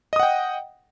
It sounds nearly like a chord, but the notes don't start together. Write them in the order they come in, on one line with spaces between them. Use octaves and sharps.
D#5 D#6 F#5 G5